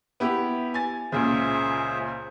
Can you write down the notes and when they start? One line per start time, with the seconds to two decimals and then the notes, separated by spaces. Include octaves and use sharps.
0.20 B3 E4 G4
0.74 G#5 A6
1.12 C#2 A#2 C#3 G#4 C5 E5